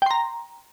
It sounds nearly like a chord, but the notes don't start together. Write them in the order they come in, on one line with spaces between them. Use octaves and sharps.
G5 C6 A#5